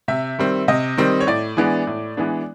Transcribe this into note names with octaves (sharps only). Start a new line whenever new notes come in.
C3 E5
D#3 G3 C4
C3 D#5
D#3 G3 C4
C#5
A2 D5
E3 G#3 B3 D4
A2
E3 G#3 B3 D4